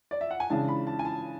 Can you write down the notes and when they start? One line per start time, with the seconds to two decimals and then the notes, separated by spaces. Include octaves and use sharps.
0.11 D5
0.21 E5
0.31 F#5
0.40 G#5
0.50 C#3 E3 G#3 D4 A5
0.68 B5
0.87 A5
0.99 G#5
1.05 A5